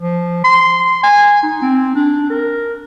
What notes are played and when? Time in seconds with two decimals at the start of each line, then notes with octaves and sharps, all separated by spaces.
0.01 F3
0.44 C6
1.03 G#5
1.43 D#4
1.62 C4
1.96 D4
2.30 A#4